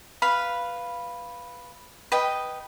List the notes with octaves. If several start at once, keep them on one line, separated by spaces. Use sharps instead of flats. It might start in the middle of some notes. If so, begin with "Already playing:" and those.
B4 F5 B5
B4 D#5 G5